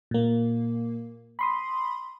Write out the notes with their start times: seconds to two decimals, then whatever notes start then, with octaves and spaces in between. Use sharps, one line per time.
0.11 A#2 A#3
1.39 B5 C6 D#6